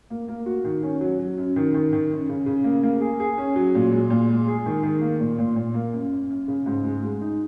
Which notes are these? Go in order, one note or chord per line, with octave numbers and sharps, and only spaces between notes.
A#3
A#3
F#4
D#3
C#4
F#3
F#3
F#2
D#3
D#3
D#3
F#2
C#3
C#3
A#3
A#3
G#4
G#4
C#4
F#3
A#2
G#3
A#2
G#3
G#4
D#3
D#3
A#3
A#2
A#2
A#2
A#3
F#2
F#2
F#2
C#3
G#2
G#3
G#3
D#4